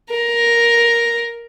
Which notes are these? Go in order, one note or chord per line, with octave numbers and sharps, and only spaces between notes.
A#4